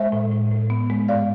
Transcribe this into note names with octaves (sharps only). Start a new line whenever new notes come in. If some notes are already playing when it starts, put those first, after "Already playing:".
Already playing: G#3 C5 E5
A2
A2
A2
B3
G#3
G#2 D5 F5